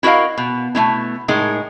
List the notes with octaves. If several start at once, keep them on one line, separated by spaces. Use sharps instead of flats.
E4 F#4 A#4 D#5 F5
B2
B2 A3 D#4 E4
A2 G#3 D#4 G#4 A#4